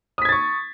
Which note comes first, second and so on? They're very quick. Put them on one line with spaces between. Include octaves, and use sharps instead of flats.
D#6 B6 G#6 A6 C#6